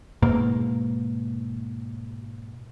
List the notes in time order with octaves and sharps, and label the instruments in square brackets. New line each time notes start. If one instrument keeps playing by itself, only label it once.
[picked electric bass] G#2 B2 A#3